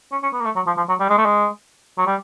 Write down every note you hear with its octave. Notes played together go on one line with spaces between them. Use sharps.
C#4
C#4
B3
A#3
A3
F#3
F3
F3
F#3
G3
G#3
A3
G#3
F#3
G3